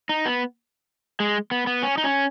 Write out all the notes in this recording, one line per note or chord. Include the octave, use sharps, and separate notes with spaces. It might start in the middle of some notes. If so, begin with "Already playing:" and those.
D#4
B3
G#3
B3
B3
C#4
D#4
C#4